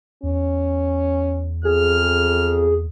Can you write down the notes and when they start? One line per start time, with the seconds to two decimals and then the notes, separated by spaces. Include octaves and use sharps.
0.23 E2 C#4
1.65 F2 G#4 F6